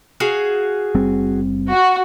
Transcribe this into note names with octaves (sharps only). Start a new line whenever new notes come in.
F#4 G#4 F5
F#1 G3 C4
F#4